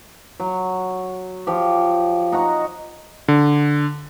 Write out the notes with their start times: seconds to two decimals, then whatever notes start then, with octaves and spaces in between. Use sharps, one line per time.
0.40 F#3
1.47 F3 G4
2.32 D#4 F#5 A#5 C#6
3.28 D3